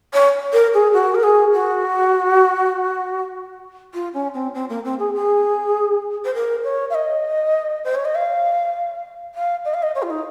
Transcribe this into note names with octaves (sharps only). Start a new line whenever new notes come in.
C#5
A#4
G#4
F#4
A#4
G#4
F#4
F4
C#4
C4
C4
A#3
C4
G#4
G#4
C5
A#4
C#5
F5
D#5
C5
C#5
D#5
F5
F5
D#5
F5
D#5
C#5
F4
D#4